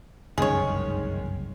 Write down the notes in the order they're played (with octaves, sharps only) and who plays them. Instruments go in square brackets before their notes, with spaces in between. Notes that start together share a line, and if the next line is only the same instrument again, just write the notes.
[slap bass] F#1 C2 G2 [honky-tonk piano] D#3 G#3 C#4 [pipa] G#4 C#5